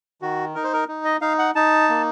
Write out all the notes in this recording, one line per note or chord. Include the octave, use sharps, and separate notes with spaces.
D#3 F#4
D#4 A#4
C5
A#4
D#4
D#5
D#4 F5
F#5
D#4 A5
A#3